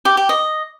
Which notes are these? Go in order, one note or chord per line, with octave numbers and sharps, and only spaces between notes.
G4
G4
D#5